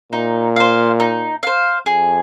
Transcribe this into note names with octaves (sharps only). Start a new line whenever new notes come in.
A#2 D#4
C5 F5
D#4
C5 F5
F2 G#4